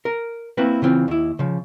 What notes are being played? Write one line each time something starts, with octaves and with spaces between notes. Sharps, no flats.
A#4
A#3 C4 E4 F#4 B4
C#3 E3 C4 F4
D#2 E4
C#3 F3